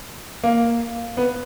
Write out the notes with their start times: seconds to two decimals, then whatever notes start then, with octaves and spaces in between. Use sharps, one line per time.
0.44 A#3
1.17 B3